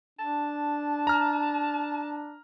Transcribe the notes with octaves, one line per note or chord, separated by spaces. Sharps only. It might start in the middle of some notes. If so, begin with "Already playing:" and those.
D4 A5
A#5 F6